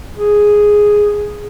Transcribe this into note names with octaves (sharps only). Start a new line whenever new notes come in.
G#4